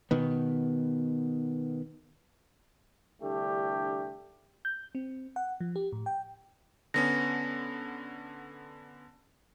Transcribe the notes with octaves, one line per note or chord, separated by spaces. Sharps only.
B2 D#3 B3
C2 D3 A3 D4 G4
G6
C4
F#5
F3
G4
A2
G5
D3 B3 C#4 A#6